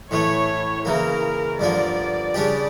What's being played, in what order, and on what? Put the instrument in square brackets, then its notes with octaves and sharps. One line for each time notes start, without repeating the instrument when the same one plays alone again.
[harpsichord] A2 E3 A3 [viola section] C#5
[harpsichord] C#3 E3 A#3 [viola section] A#4
[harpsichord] G2 D3 F3 A#3 [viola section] D5
[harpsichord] C#3 G3 D4 G4